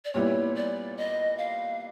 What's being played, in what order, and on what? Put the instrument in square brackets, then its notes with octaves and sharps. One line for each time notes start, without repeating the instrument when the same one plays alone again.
[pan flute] D5
[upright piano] A#2 G3 B3 E4 [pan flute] C#5
[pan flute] D5
D#5
F5